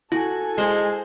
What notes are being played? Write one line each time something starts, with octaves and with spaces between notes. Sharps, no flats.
E4 F#4 A4 G#5
G#3 C5 F#5